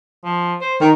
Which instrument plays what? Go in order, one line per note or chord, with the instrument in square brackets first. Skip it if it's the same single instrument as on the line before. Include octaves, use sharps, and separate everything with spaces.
[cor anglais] F3
C5
[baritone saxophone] D#3 [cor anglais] A#4